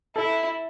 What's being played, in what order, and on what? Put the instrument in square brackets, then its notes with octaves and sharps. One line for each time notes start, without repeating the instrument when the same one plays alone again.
[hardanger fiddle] E4 [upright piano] A4